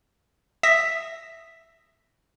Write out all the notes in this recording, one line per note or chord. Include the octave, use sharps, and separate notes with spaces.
E5 D#6 E6 A#6 B6